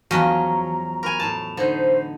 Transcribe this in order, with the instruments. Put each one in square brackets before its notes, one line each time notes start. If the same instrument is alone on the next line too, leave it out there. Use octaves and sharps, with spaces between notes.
[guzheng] E2 F3 [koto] F#3 C#4 D#5 [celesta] F#4 [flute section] A#5
[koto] A#4 G#5 [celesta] B5 C#6 F7
[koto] A2 A5
[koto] D3 D#4 [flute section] C5